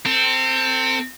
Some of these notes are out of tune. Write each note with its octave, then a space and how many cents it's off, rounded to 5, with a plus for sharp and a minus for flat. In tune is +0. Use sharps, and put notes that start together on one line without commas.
C4 +0 A4 +40